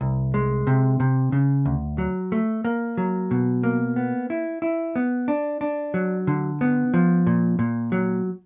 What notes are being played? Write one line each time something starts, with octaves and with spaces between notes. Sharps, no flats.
C2
G#3
C3
C3
C#3
D2
F#3
A3
A#3
F#3
B2
A#3
B3
E4
E4
B3
D4
D4
F#3
D3
B3
F3
A#2
A#2
F#3